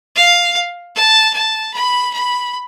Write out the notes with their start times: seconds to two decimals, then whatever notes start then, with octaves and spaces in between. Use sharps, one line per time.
0.16 F5
0.95 A5
1.34 A5
1.74 B5
2.13 B5